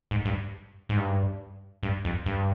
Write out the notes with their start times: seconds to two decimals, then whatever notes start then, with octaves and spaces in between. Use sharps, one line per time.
0.11 G#2
0.25 G2
0.89 G#2
0.97 G2
1.83 G2
2.05 F2
2.26 G2